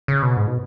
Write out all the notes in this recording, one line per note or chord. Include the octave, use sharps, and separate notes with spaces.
C#3
B2
G#2
B2